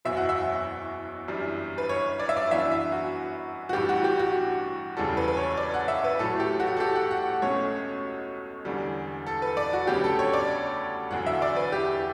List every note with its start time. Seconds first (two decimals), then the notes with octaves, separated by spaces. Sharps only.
0.05 F#1 E2 B2 F#3 E5
0.17 F#5
0.29 E5
1.28 G1 F#2 E3 G3
1.78 B4
1.89 C#5
2.19 D5
2.29 E5
2.37 D5
2.50 F#2 E3 B3 D4 E5
2.72 E5
2.92 F#4
3.69 F#4
3.73 A1 G2 E3 G4
3.89 F#4
4.04 G4
4.19 F#4
4.97 E1 E2 C#3 E3 G3 A4
5.17 B4
5.28 B4
5.37 C#5
5.57 D5
5.74 F#5
5.88 E5
6.04 B4
6.19 A1 A2 F#3 A3 A4
6.40 G4
6.60 F#4
6.77 A4
6.80 G4
6.96 F#5
7.11 F#5
7.42 C#2 B2 A3 C#4 C#5
8.65 E1 E2 D3 G3
9.27 A4
9.42 B4
9.57 D5
9.73 F#4
9.87 D2 C#3 F#3 B3 D4 G4
10.04 A4
10.19 C#5
10.33 D5
11.11 E1 E2 D3 F#3 F#5
11.26 E5
11.42 D5
11.56 B4
11.72 G4